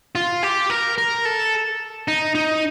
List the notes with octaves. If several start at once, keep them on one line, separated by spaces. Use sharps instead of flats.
F4
G4
A#4
A#4
A4
D#4
D#4